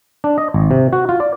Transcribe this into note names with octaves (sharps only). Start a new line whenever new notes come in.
D4
D#5
G#1
C3
F#4
F4
D5